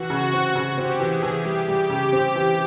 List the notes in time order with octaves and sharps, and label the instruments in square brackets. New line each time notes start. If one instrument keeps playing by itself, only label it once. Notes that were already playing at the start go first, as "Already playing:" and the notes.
Already playing: [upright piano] E3 [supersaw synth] F#4
[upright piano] C#3
C4
C#3
[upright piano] C4 [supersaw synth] G4
[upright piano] E3
[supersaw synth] G#4
[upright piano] E3
[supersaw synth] G4
[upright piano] G3
[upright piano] G3 [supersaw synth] G4
[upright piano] C#3
C4
E3